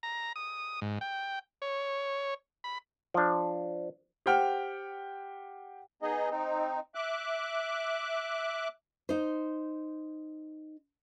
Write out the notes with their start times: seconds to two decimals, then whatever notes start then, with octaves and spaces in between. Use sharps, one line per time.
0.03 A#5
0.36 D#6
0.82 G#2
1.01 G5
1.62 C#5
2.64 B5
3.14 F3 D4
4.26 G4 C5 F#5 G5 F6
6.02 B3 D#4 G#4 D#5
6.30 C4 D#4
6.95 E5 D6 F#6
9.09 D#4 C5